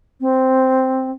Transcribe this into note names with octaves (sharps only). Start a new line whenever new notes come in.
C4